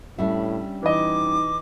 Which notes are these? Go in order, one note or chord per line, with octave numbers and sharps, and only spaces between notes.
A2 G3 C#4 D4 E5
E3 D#4 D#5 D6